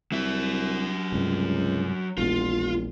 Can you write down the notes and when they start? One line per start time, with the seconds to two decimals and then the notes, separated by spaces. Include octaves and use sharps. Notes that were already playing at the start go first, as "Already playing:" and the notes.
0.12 C2 F#3 E5
1.12 C#2 G2 C3
2.18 E1 A#1 A#2 F4